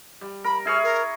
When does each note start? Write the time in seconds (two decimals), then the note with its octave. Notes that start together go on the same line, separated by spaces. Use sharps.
0.21 G3
0.44 A#4 B5
0.65 E4 G#4 C#5 F6
0.83 A#4